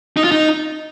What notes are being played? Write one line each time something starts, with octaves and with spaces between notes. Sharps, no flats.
D#4
F4
D#4